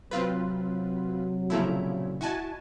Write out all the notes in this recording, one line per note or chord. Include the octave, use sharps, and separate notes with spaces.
C3 F#3 C4 F4 B4
A#2 C#3 F3 A3 E4 A#5
E4 F#4 D#5 G#5 A5